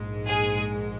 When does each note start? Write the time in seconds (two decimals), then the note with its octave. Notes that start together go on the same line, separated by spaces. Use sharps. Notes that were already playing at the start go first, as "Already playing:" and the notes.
Already playing: A#1 G#2 G#3
0.27 G#4